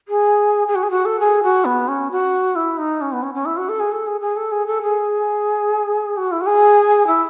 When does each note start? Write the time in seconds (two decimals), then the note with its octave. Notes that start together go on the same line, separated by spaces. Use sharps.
0.08 G#4
0.68 G#4
0.75 F#4
0.83 G#4
0.91 F#4
1.05 A4
1.20 G#4
1.43 F#4
1.65 B3
1.88 C#4
2.11 F#4
2.56 E4
2.78 D#4
3.01 C#4
3.12 B3
3.23 C#4
3.34 C#4
3.46 E4
3.57 F#4
3.69 A4
3.80 G#4
3.92 A4
4.07 G#4
4.21 G#4
4.37 A4
4.52 G#4
4.67 A4
4.82 G#4
6.17 F#4
6.32 E4
6.41 F#4
6.46 G#4
7.07 E4